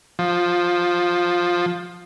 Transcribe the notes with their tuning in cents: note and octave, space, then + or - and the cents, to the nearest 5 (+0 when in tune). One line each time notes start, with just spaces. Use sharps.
F3 +10